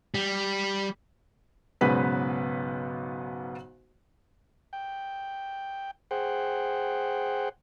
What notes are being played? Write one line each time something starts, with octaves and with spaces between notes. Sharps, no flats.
G3
B1 G#2 C#3 B3 B4 B6
G5
G#4 C5 F#5 G5